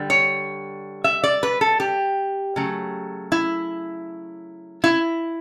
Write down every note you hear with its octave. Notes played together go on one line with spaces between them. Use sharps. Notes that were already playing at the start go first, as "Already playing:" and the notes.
Already playing: D3 G3
C#5
E5
D5
B4
A4
G4
C#3 F#3 A3
E4
E4